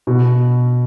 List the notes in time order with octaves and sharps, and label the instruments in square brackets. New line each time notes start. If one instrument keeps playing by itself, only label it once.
[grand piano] B2